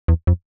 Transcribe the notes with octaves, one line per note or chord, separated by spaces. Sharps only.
E2
F2